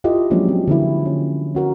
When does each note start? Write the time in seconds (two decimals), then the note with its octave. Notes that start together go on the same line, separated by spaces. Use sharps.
0.04 E4 F4 G4 A4 D#5
0.30 F3 F#3 G#3 A#3 C#4 D4
0.48 C4
0.68 D3 F3 E4
1.05 C#4
1.55 C#4 F#4 A#4